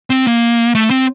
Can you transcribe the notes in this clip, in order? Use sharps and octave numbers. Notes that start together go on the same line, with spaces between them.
C4
A#3
A3
C4